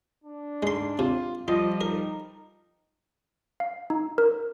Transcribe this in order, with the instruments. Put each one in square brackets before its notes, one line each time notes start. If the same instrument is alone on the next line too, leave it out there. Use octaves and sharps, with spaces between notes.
[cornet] D4
[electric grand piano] G#2 [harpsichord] G#3 C6
[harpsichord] C3 [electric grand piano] F4
[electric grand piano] F3 G3 [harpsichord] F4 [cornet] D#5
[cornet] D#4 [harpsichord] A#4
[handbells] F5
D#4
A#4